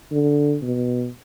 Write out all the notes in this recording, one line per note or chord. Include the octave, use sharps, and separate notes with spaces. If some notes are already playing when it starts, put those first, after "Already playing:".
D3
B2